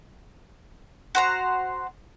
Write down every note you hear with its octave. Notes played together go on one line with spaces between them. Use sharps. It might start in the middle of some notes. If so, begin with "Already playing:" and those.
F#4 C5 A#5